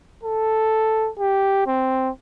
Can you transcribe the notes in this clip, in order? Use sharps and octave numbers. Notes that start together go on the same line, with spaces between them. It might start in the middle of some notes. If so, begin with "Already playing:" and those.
A4
G4
C4